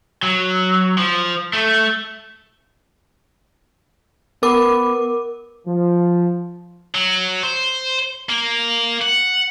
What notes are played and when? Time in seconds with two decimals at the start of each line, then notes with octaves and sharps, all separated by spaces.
0.23 F#3
0.97 F3
1.53 A3
4.43 B3 A#4 D6
5.68 F3
6.95 F#3
7.43 C5
8.30 A#3
9.02 F#5